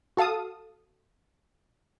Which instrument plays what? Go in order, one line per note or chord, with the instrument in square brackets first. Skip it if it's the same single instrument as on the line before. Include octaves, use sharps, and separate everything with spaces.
[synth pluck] F#4 A4 F5 A5 D#6